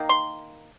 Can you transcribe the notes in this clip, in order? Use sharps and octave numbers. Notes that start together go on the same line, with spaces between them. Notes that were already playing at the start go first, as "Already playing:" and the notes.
Already playing: D#3 A#3
C6